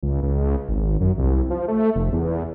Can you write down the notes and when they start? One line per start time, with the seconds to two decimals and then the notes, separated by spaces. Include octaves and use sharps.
0.03 C#2
0.23 C#2
0.68 G#1
1.01 F#2
1.18 C2
1.50 F3
1.68 A3
1.95 F1
2.12 E2